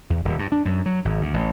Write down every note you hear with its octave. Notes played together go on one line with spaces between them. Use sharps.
E2
D#1
G2
D4
F#2
F#3
G#1
D2
A1